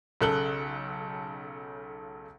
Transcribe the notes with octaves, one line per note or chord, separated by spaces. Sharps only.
B1 C#3 A4 F#6 F#7 G7